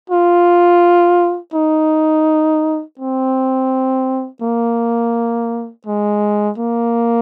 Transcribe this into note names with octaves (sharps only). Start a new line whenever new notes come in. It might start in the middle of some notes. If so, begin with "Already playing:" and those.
F4
D#4
C4
A#3
G#3
A#3